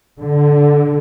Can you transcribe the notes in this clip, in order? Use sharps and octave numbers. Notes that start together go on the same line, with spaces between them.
D3